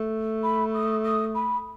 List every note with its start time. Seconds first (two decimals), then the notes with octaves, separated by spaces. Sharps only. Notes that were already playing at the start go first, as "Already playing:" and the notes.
Already playing: A3
0.43 B5
0.74 D#6
1.04 D#6
1.35 B5